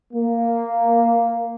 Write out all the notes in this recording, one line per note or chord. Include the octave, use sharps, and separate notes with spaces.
A#3